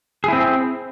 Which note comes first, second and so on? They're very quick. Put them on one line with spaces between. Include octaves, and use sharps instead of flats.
G#4 E4 C4